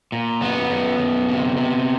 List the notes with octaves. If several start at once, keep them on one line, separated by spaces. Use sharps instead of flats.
A#2
F#2 B3
F#2
F#2
C3
C3